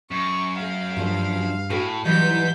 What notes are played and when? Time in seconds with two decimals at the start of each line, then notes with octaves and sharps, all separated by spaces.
0.11 F#2 C#6
0.60 A3 F5
0.97 G2 F3 A3 D4
1.70 A2 F#4 A4 G#5
2.05 G#2 E3 F#3 G3 D#5 G6 B6